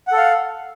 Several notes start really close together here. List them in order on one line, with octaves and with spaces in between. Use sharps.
F#5 A4 F5